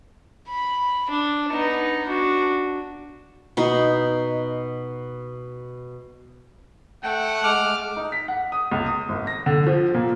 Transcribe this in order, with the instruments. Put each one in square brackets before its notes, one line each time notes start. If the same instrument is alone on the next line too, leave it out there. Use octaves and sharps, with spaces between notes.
[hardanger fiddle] B5
D4
B3 D#4
D4 F#4
[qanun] B2 D#4
[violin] A3 [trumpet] F#5 [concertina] G5
[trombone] G#3 [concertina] D6 F6
[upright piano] D#4
B6
F#5
D#6
C#2
D#6
G#1
A#6
D3
F3
A#2